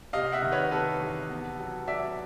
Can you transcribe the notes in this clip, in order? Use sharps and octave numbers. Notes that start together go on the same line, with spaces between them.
C3 D#5 F5
E5 F#5
D#3
B4 C#5
C3 A4 B4
E2
B3
F#3
F#3 D5 E5